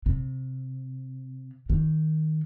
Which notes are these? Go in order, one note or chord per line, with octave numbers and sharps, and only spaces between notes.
C3
D#3